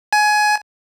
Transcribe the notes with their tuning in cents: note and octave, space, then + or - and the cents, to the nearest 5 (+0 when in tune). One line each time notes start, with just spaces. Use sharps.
G#5 +20